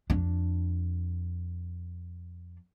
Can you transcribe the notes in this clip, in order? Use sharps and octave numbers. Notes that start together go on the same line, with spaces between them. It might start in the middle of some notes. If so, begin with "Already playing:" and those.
F2 D4